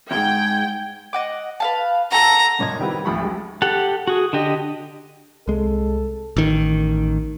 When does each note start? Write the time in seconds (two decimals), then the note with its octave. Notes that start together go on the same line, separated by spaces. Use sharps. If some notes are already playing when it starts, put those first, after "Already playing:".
0.11 D2 G#2 G5 G#6
1.13 D#5 F#5 D6
1.60 B4 F5 A5
2.12 F#4 A4 A#5
2.59 F#2 A#2 C#5 D#5 G#6
2.79 D#3 G3 C4 E4 F#4 B4
3.05 A1 D2 F3 E5 B5 C#6
3.21 F#3 G#3 G4
3.62 G4 A4 F#5
4.07 F#4 G#4
4.33 D3 D4 G4 D#5
5.48 C2 G#3 A4
6.37 A1 D#3